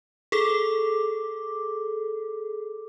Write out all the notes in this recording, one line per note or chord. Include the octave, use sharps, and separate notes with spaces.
G#4 A4 D6